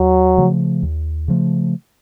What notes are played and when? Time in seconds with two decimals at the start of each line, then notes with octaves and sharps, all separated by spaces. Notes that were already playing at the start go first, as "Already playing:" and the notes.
Already playing: D#2 F#3
0.38 C#3 F3 A3
0.83 D#2
1.28 C#3 F3 A3